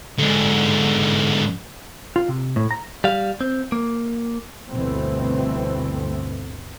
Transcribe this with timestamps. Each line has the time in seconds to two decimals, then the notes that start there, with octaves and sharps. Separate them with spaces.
0.19 G#2 D3
2.16 F4
2.28 C3
2.56 A2
2.71 A#5
3.04 G3 F5
3.41 C4
3.72 A#3
4.69 G1 D2 B2 E3 A3 C4